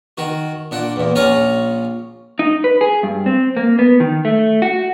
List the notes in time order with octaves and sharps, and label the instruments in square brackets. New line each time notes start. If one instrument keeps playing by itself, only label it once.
[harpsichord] D#3 F#4
A#2 D4 F#5
E2 A#2
A#1 C#4 F4 C#5 F5 A#5
[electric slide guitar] D#4
B4
G#4
G2
C4
A#3
B3
D#3
A3
F#4